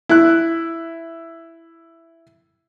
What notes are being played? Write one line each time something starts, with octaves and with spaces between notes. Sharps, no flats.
E4 F#6